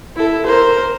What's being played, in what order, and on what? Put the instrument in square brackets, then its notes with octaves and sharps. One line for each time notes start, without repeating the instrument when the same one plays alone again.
[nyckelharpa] E4 A4
A#4 C5